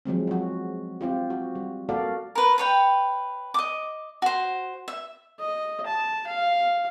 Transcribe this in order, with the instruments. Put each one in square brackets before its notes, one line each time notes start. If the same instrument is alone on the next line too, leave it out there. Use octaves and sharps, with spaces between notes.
[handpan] F3 F#3 G#3 C4
F#3 F#4
C4 F4 G4
F#4
G3
A#3 F#4 A4 D5 F5
[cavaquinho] A#4 B4
B4 C#5 G5
D#5 D6
F#4 C5
E5
[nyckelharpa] D#5
A5
F5